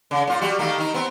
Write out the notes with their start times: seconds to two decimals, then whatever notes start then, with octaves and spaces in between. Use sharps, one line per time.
0.11 C#3
0.27 A#2 F4
0.41 G3 F#4
0.59 D#3 A3 A#3
0.78 D#3 D#4
0.94 B3 C4